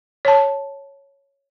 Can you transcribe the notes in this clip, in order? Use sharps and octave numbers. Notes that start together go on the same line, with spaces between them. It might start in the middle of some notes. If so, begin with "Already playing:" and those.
C#5 A5